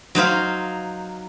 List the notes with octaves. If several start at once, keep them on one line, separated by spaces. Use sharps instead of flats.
F#3 D#4 C5 F5